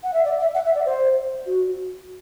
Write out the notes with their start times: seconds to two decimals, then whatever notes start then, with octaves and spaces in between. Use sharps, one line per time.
0.04 F#5
0.14 E5
0.25 D5
0.40 E5
0.55 F#5
0.66 E5
0.75 D5
0.86 C5
1.47 F#4